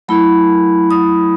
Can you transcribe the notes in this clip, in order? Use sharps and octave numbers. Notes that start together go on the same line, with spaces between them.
F#3 A3 E4 B5
D#6